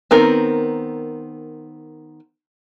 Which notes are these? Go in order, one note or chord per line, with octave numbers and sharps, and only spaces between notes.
D#3 B3 C4 A#4